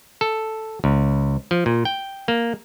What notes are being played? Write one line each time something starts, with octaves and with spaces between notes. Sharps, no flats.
A4
C#2
F3
A#2
G5
A#3